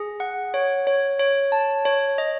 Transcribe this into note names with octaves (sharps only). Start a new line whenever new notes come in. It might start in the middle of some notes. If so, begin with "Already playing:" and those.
Already playing: G#4
F#5
C#5
C#5
C#5
A5
C#5
D#5